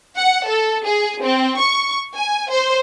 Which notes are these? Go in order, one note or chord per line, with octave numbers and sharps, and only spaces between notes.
F#5
A4
G#4
C4
C#6
G#5
C5